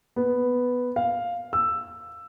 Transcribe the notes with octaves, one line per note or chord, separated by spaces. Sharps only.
B3
F5
E6